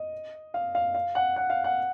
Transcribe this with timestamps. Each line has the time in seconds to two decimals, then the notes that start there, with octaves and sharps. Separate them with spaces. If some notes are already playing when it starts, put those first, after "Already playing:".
Already playing: D#5
0.54 F5
0.75 F5
0.94 F5
1.15 F#5
1.36 F#5
1.50 F5
1.64 F#5